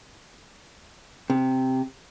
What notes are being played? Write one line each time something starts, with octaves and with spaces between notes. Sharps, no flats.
C3